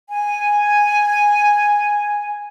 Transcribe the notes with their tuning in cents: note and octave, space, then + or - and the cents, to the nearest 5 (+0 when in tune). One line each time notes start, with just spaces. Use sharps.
G#5 -5